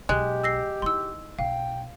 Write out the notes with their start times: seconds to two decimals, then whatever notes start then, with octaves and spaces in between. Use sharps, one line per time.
0.09 B1 G#3 G4 F#6
0.44 E6 A#6 C7
0.82 D#4 E4 C6 E6
1.39 B1 F5 G5